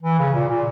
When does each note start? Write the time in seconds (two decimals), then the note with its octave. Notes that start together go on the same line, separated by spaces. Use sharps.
0.03 E3
0.19 C#3
0.34 A#2
0.49 A#2